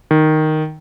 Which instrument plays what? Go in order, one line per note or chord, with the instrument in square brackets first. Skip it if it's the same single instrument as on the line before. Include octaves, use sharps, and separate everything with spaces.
[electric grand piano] D#3